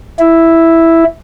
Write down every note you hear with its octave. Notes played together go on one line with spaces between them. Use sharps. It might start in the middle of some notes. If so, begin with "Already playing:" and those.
E4